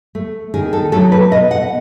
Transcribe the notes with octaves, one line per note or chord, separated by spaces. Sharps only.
A3
D#3 G#4
A4
F#3 A3 A4
B4
B2 D#5
F#5